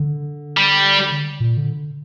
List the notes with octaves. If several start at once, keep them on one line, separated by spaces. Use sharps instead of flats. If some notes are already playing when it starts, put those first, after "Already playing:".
Already playing: D3
G3
A#2
D3